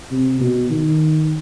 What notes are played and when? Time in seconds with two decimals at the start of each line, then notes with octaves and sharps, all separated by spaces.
0.11 C3
0.40 B2
0.70 D#3